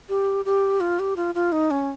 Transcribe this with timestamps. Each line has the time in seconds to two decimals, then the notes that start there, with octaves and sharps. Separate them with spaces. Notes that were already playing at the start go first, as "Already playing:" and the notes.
0.09 G4
0.45 G4
0.81 F4
0.99 G4
1.16 F4
1.35 F4
1.52 D#4
1.71 C#4